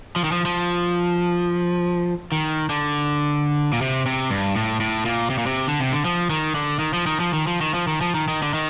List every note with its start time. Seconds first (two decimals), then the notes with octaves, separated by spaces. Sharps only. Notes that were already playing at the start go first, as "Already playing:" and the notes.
0.16 F3
0.24 D#3
0.32 F3
0.45 F3
2.32 D#3
2.70 D3
3.72 A#2
3.81 C3
4.06 C3
4.30 G2
4.56 A2
4.80 A2
5.05 A#2
5.30 C3
5.38 A#2
5.46 C3
5.68 D3
5.80 C3
5.92 D3
6.05 F3
6.30 D#3
6.55 D3
6.79 D#3
6.93 F3
7.06 D#3
7.20 F3
7.33 D#3
7.47 F3
7.61 D#3
7.74 F3
7.87 D#3
8.01 F3
8.15 D#3
8.28 D#3
8.42 D3
8.54 D#3